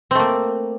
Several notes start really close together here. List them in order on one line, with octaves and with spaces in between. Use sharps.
C4 A3 A#3